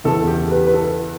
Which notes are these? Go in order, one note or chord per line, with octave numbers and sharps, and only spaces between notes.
E2 C#3 E3 A4
G4
B4
B4
A4